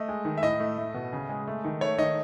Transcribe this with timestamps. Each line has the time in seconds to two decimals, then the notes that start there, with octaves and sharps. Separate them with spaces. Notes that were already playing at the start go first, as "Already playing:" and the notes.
Already playing: A3 D#5
0.09 G#3
0.25 D#3
0.37 E5
0.43 A2 D#5
0.60 A3
0.78 A3
0.94 B2
1.13 C#3
1.29 G#3
1.47 A3
1.64 D#3
1.81 A3 C#5
1.98 D#3 D#5